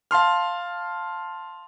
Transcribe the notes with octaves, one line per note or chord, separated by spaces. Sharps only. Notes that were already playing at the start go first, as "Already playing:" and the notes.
F5 A5 C6 F6